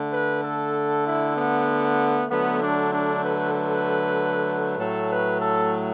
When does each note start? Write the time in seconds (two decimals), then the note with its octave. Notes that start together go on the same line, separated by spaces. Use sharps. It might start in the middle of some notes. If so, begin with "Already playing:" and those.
Already playing: D3 A3
0.11 B4
0.42 A4
1.05 E4
1.36 B3
2.29 D3 F#3 A3 B3
2.60 D4
2.91 D4
3.22 B4
3.54 B4
4.78 A2 F#3 A3 A4
5.10 B4
5.41 A4